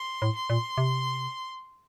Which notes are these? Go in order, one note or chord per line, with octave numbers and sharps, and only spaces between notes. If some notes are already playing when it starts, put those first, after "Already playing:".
Already playing: C6
A2
C6
A#2
C3